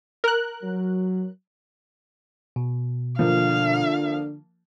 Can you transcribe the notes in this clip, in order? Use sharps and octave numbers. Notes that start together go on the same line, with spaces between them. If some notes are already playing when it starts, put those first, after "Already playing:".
A#4 F#6
F#3
B2
D3 F3 A#3 F5